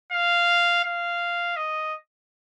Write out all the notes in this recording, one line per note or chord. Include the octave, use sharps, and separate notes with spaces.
F5
F5
D#5